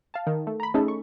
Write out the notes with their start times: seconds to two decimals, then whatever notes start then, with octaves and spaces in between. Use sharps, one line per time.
0.14 F5 A5
0.27 D#3
0.47 A3
0.60 A#5 B5
0.74 A3 C#4 D#4 G#4 A4
0.88 C#6